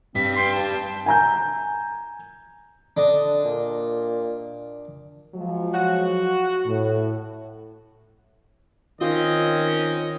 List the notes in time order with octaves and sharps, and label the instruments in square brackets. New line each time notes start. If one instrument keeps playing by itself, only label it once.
[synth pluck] G2 [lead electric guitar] G3 B4 [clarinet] C4 [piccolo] B6
[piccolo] G5 [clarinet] C6
[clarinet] A5
[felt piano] G#5 A#5 G6
[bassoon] D3 [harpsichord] D4 D#5
[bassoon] A#2
[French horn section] F3 F#3 G#3
[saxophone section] F#4
[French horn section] A2
[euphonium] D#3 [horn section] C4 C#4 D#5 [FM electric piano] F4